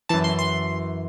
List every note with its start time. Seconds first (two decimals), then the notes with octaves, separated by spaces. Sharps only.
0.09 F#2 E3 A5
0.24 C6
0.39 C6